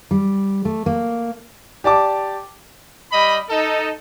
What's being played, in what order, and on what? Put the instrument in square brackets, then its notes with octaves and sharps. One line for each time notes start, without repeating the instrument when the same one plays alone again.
[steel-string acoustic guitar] G3
A3
A#3
[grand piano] G4 D5 A5 D6
[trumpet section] G3 D#5 B5
D#4 A4